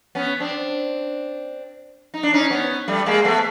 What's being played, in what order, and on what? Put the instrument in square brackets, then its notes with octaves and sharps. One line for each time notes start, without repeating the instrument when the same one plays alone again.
[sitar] B3 C#4
C4 D4
D#4
D4
C#4 D#4
B3 C#4
G3 A3
G#3 A#3
A3 B3